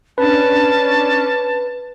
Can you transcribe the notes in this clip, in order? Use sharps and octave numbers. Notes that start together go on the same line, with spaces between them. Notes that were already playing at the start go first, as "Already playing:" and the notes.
C#4 D4 B4 A5